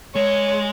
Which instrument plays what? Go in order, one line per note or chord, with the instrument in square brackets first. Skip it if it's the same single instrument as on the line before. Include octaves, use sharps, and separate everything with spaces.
[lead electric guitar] G#3 [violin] C#5